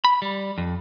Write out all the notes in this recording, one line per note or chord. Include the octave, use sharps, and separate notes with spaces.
B5
G3
F2